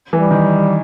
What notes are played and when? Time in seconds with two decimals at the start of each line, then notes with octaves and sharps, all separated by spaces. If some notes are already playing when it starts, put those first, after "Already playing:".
0.13 E3 G3
0.31 D#3